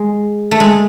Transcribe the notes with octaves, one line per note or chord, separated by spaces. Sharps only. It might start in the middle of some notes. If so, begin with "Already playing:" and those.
Already playing: G#3
A3
G#3